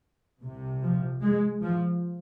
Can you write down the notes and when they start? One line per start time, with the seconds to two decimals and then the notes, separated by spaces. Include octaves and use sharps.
0.42 C2 C3
0.82 F3
1.21 G#3
1.62 F3